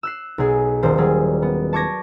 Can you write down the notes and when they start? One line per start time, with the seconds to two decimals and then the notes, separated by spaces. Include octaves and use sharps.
0.03 E6 F#6 C7
0.38 B1 G#4
0.83 D#1 C5
0.98 F#3 G3 G#4
1.42 B3
1.73 A5 C#6 D6 G#6 A#6